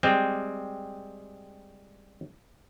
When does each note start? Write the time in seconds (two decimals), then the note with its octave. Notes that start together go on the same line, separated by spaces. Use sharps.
0.03 G3 G#3 C4